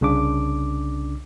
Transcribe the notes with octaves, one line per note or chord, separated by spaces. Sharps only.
C2 C#3 D4 D6